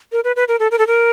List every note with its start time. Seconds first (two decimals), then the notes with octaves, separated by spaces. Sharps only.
0.12 A#4
0.24 B4
0.36 B4
0.48 A#4
0.59 A4
0.71 A#4
0.78 A4
0.87 A#4